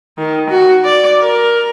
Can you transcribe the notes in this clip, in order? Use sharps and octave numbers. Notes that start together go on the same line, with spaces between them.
D#3
F#4
D5
A#4